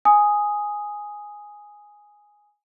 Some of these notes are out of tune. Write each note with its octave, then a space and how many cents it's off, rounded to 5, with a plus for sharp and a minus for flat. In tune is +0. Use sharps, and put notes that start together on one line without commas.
G#5 +0 D#6 +0